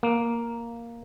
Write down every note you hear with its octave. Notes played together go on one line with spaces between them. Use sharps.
A#3